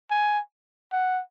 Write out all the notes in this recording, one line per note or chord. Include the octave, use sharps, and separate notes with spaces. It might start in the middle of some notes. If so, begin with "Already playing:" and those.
G#5
F#5